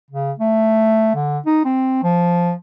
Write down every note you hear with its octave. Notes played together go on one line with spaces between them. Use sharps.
C#3
A3
D3
D#4
C4
F3